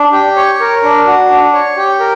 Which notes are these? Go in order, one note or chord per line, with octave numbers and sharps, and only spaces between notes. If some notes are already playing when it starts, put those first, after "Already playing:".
Already playing: D4
G4
C#5
A#4
D4
F#4
D4
C#5
G4
A#4